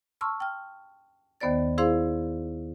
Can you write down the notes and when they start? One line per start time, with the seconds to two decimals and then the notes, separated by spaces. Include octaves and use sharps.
0.21 A5 C6 C#6 E6 F6
0.40 G5 F6
1.41 D#2 D#3 B3 C5 D5 A6
1.78 E4 G#4 C5 F5 C6